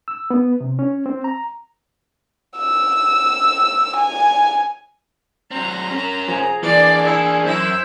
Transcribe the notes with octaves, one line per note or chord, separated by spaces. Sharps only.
E6
B3
C3
C#4
C4
A#5
E6
G#5
F#3 C4 A#5
C#4 A#4
F3 G#4 G#5
E3 A#3 D4 D5
E4
F#2 E4 C5 E5